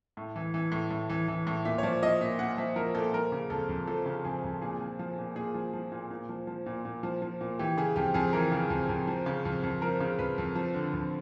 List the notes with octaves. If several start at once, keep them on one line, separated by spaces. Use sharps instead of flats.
A2
E3
E3
A2
A2
E3
E3
A2
A#2 E5
C#5
F3 D5
F3 D#5
A#2 E5
A#2 F#5
F3 E5
F3 A#4
A#2 A4
F3 A#4
C#3
F2 A4
F2
F3 A4
C#3
F2 G#4
F2
A#2 G#4
F3
F3
A#2
A#2 G#4
F3
F3
A#2
A#2
F3
F3
A#2
A#2
F3
F3
A#2
E3 G4
C#3 G#4
F2 G4
F2 G#4
E3 A#4
C#3
F2
F2
F3
C#3
F2
F2
F3 A#4
C#3
F2 B4
F2
F3
D3
F2